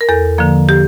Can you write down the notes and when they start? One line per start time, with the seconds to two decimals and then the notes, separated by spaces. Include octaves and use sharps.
0.01 A#4
0.09 E2 A4
0.38 D3 F3 A#3
0.69 G4